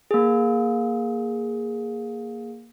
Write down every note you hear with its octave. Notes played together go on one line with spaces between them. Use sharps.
A#3 G#4